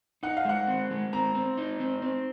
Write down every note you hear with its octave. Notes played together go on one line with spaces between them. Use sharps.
D#4 F#5
F5
G#3 F#5
C4
G#3
C4 A#5
C4
D#4
C4
C4